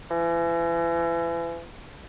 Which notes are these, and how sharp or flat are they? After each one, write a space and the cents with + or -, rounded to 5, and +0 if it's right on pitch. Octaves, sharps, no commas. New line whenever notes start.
E3 +35